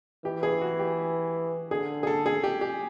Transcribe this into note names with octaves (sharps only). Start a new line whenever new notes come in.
E3 G4
G#4
F#4
G4
D3 G#4
G#4
A4
G#4
G4
G4